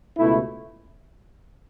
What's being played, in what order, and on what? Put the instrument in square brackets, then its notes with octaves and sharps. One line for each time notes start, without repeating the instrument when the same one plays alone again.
[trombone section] C#2 B2 A3 E4